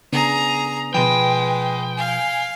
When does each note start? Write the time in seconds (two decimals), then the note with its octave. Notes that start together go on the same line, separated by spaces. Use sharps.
0.13 C#3 B3 D4 G#4 A#5
0.94 B2 F3 G#3 B4 G5
1.97 F5 G#5